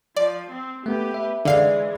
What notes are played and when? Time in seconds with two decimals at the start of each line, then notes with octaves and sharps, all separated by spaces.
0.17 F3 D5
0.51 C4
0.86 A3 B3 G4 B4
1.14 E5
1.45 D3 E3 G#3 D5 F5 C7